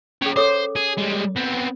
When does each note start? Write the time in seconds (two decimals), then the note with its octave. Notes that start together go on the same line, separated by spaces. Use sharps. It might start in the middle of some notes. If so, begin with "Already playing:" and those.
0.22 C#4 G4 G#4 C#5
0.36 A4 C5 C#5 D6
0.76 G#4
0.97 G3 G#3
1.36 B3 C4